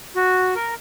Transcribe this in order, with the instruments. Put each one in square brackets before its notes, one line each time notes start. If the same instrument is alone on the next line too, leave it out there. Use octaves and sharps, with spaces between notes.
[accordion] F#4
A#4